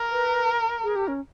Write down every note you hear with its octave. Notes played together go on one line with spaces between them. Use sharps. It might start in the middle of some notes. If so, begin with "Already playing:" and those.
Already playing: A#4
B4
G#4
G4
C#4